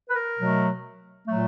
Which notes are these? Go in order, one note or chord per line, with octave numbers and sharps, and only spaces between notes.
B4
A#4
B2 F#3 A3
A#2 F#3 A3